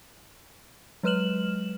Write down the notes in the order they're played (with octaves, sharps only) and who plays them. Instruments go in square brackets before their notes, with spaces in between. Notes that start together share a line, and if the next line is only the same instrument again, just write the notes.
[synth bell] F#3 G#3 B4 F6 E7 F#7